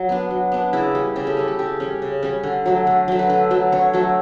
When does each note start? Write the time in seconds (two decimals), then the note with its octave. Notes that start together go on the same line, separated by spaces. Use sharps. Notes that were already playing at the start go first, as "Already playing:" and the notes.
Already playing: F#3
0.09 B3 D4
0.31 F#3
0.52 B3 D4
0.73 C#3 E4
0.95 G3 C#4
1.16 C#3 G4
1.27 A4
1.37 G3 C#4
1.48 A4
1.59 C#3 G4
1.80 G3 C#4
2.02 C#3
2.23 G3 C#4
2.43 D3
2.66 F#3 A3
2.87 D3
3.08 F#3 A3
3.19 B4
3.29 D3 A4
3.51 F#3 A3
3.72 D3 C#5
3.93 F#3 A3